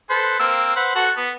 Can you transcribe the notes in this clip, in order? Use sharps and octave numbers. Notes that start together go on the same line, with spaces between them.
A4 B4 C5
A#3 C4 E6
B4 C5 F#5
F#4 A4 F#5
B3